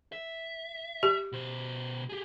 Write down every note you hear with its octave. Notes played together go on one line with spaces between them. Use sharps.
E5
G4
B2 C5
G4 G#4